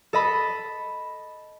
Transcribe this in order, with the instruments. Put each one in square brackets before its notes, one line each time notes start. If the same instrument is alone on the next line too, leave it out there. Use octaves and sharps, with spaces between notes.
[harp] A4 D#5 B5